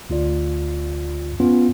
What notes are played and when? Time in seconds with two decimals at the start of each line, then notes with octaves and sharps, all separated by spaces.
0.10 D2 F4 D5
1.40 B3 C#4 F4